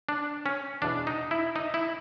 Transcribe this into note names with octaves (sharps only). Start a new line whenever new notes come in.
D4
C#4
E2 B2 D4
D#4
E4
D#4
E4